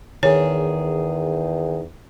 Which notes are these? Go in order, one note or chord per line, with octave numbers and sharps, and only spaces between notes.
E2 D#3 G#4 C#5